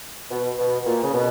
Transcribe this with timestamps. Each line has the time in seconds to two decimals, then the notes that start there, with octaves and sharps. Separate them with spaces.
0.31 B2
0.59 B2
0.86 A#2
1.03 C#3
1.14 B2